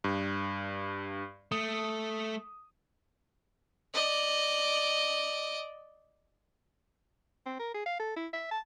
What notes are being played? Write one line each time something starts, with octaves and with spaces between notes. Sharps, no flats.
G2
A3 D#6
D5 D#5
C4
A#4
G#4
F5
A4
E4
E5
A5